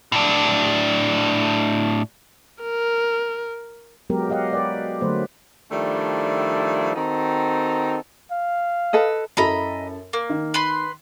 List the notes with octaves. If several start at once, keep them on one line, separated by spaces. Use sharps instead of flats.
A2 D4
A#4
F#3 G#3 B3 G4 A#4
F#4 G4 D#5 F5 F#5
B4 D5
D3 F#3 A3 A#3 B4 C5
D#3 F3 G3 A3 D4 E4
D#3 C4 D#4 F#4 A4 A#5
F5
A4 B4 D#5
F#2 E4 A4 D#5 A#5 B5
A#3
D#3
B4 B5 C6